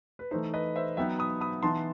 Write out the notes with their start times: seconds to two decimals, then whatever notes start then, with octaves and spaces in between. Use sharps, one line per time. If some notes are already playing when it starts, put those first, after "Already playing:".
0.19 B4
0.31 E3 A3 D#4 C5
0.53 B4 D#5
0.76 C5 E5
0.97 F#3 B3 D#4 E5 G5
1.19 B5 D#6
1.41 B5 D#6
1.63 E3 B3 D#4 A5 C6